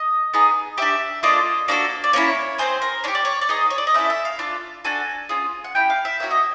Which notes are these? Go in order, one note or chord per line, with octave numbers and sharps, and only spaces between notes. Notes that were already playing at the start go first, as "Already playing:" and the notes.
Already playing: D#5
B3 D#4 G#4
D4 G4 E5
A#3 D4 F4 A4 D#5
A#3 D4 F#4 A4 D5
D5
A#3 C#4 E4 C#5
C4 D#4 G#4 C5
A#4
D4 G4 C#5
D5
C#5
D5
B3 D#4 G#4 D#5
C#5
D5
D#5
A3 C#4 E4 A4 E5
E5
F5
D4 F4 A4
D4 F#4 A4 G#5
C#4 F4 G#4
F#5
C#4 E4 G4 G5
F5
E5
A#3 C#4 F#4 E5
D#5